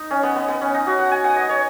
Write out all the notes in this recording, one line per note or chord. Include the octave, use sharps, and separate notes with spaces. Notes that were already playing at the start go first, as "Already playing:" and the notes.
Already playing: D#4
C#4
B3
B3
B3
C#4
D#4
F#4
F#5
G#5
F#5
D#5
C#5